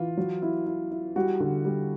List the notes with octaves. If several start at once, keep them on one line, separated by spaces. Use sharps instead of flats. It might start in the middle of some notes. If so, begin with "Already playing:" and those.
Already playing: E3 F4
F#3
E4
E4
E4
G3 F#4
D3
G3